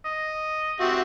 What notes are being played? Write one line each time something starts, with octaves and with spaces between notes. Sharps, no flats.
D#5
C4 F#4 G4 E5